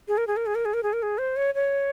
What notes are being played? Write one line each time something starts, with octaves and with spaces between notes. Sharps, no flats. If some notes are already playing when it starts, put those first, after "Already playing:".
G#4
A#4
G#4
A#4
G#4
A#4
G#4
A#4
G#4
A#4
G#4
C5
C#5
C#5